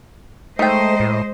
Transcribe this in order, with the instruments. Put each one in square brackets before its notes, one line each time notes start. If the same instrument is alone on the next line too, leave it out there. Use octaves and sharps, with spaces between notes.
[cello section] G#3 C5 D#5 [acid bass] A3 [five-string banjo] D#4 G5
[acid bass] A2